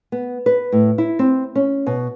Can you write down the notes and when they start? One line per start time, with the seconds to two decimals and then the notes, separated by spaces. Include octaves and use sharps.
0.12 B3
0.46 B4
0.72 A2
0.98 E4
1.19 C4
1.55 C#4
1.86 B2